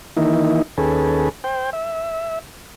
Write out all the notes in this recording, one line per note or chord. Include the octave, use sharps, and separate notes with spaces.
D#3 E3 A#3 D#4 E4
D#2 C#4 G#4 A4 B4
C5 G5
E5